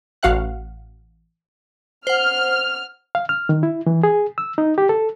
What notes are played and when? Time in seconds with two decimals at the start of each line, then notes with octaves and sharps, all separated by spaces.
0.23 A1 F#4 F5 F#5 F#6
2.07 C5 F#5 F6
3.15 F5
3.29 F6
3.49 D#3
3.63 E4
3.86 E3
4.03 G#4
4.38 E6
4.58 D#4
4.78 G4
4.89 A4